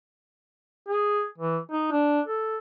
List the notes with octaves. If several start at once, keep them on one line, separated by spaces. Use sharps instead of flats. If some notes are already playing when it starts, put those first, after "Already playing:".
G#4
E3
D#4
D4
A4